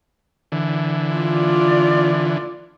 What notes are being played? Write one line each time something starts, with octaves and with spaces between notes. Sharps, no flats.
D3 E3
F4 D5